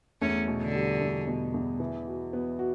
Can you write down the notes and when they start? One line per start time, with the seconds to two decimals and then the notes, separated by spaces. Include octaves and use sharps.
0.21 E2 A3 C#4
0.47 B2
0.61 D3
0.74 G3
1.01 E2
1.28 B2
1.54 E2
1.80 E3
2.07 F#4
2.33 B3
2.59 F#4